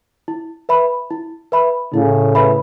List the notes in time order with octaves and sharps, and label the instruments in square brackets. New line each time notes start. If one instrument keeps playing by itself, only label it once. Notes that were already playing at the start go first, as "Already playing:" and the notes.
[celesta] E4
B4 E5 B5
E4
B4 E5 B5
[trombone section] A2 C#3 [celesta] E4
[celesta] B4 E5 B5